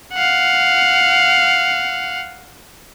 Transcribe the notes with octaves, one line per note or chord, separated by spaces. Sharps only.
F5 F#5